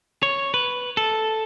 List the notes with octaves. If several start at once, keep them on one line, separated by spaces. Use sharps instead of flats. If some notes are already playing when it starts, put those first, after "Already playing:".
C#5
B4
A4